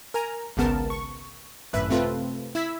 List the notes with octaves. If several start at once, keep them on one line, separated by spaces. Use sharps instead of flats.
A#4 G#5 A#5
G#1 C#2 C#3 B3 A#4 A5
C#6
G#1 F#2 A2 B4 E5 B5
C3 A3 C4 F4 A4 B4
E4 E6 G#6 B6